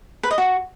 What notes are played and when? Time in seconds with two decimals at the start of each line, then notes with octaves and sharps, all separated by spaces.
0.23 B4
0.31 D#5
0.38 F#4